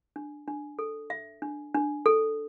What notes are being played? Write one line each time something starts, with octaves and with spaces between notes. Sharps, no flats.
D4
D4
A4
E5
D4
D4
A4